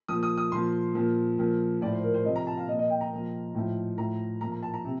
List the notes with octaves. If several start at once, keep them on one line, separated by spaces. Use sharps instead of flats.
A#2 F3 D#6
D#6
D#6
A#2 F3 C6
A#2 F3
A#2 F3
A2 F3 D5
C5
A#4
C5
C3 F3 D#5
A#5
A5
F5
A#2 F3 D#5
D#5
G5
A#5
A#2 F3
A2 F3
A2 F3 A#5
A#2 F3 A#5
A#5
A5
A#5
C3